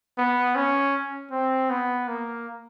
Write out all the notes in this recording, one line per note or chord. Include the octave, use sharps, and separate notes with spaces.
B3
C#4
C4
B3
A#3